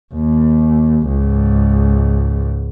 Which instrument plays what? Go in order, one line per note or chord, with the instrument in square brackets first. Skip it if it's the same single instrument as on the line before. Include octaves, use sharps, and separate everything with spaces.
[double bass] D#2
C#2 G#2